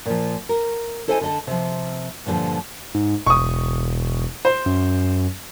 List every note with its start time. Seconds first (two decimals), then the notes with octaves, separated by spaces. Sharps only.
0.06 A#2 F3
0.49 A#4
1.08 E4 A4 C5 D#5 G5 G#5
1.21 D3 D#5 A5
1.47 C3 F3
2.26 G2 A#2 D3 E3 F3
2.95 G#2
3.26 E1 C#6 D#6
4.45 C5
4.66 F#2